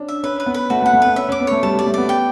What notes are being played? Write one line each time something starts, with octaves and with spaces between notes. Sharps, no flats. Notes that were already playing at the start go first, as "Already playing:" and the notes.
Already playing: C#4 D4
E5
C#4 B4
B4
B3
B4
A3 F#4
A3
F#5
A3
B3 B4
C#4 E5
C#4 D6
B3
A3 C#5
G3 A5
G3 D5
A3
B3 D5
G5